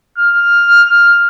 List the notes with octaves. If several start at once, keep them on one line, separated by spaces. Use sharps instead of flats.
F6